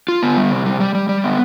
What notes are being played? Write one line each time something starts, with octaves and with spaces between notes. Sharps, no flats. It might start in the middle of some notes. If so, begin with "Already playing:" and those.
F4
B3
G3
C3
G3
G3
G3
G3
B3